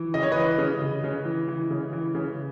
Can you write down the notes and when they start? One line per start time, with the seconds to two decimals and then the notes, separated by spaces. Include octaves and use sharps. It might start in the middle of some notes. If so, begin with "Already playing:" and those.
Already playing: E3
0.14 C#3 D#5
0.23 C#5
0.32 B4 D#5
0.37 E3
0.58 C#3
0.82 C#3
1.04 C#3
1.25 E3
1.48 E3
1.70 C#3
1.93 E3
2.15 C#3